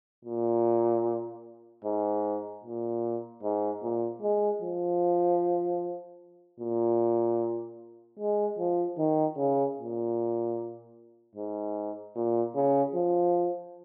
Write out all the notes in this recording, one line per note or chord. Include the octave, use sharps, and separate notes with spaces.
A#2
G#2
A#2
G#2
A#2
G#3
F3
A#2
G#3
F3
D#3
C#3
A#2
G#2
A#2
C#3
F3